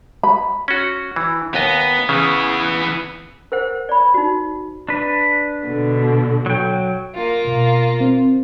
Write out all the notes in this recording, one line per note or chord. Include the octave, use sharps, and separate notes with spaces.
B5
C#4 F#4
E3
D#2 B3 D#5
C#3 E3 B3
A#4 C5 F#5
D5 B5
D#4 F#4
D4 B4
B2 D3
F#3 G5
A#3 F4
B2 B3
C4